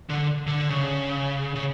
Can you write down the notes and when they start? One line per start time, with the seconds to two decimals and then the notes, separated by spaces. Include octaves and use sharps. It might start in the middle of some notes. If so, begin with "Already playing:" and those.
0.10 D3
0.47 D3
0.70 C#3
1.55 C#3